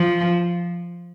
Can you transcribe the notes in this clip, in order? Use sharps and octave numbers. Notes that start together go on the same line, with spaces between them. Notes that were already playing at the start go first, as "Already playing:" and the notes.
Already playing: F3